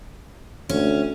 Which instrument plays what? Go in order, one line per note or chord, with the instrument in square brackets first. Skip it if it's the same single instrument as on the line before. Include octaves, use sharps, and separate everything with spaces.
[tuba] D2 [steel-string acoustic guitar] C#4